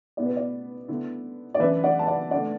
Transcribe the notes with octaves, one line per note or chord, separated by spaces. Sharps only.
B2 B3 E4 D5
B4
D5
D3 B3 E4
D5
F#2 E3 D4 B4 E5
D5 F#5
A5
D5 F#5
D3 A3 D4 D5 F#5